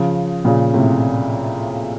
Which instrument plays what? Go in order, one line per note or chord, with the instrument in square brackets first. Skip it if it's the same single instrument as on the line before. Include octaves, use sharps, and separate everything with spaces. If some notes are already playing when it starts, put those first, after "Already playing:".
Already playing: [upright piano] C#3 F3
A#2 C#3
A2 C3